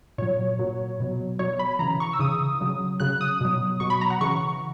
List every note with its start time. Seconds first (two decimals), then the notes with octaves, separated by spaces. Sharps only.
0.18 A#2 F#3 C#5
0.59 A#2 F#3
1.00 B2 F#3
1.39 B2 F#3 C#5
1.59 B5
1.79 C#3 E3 A#5
2.00 C#6
2.13 E6
2.19 C#3 E3 D#6
2.61 C#3 F#3
3.00 C#3 F#3 F#6
3.21 D#6
3.41 B2 F#3
3.80 B2 F#3 C#6
3.90 B5
4.01 A#5
4.10 F#5
4.21 C#3 E3 C#6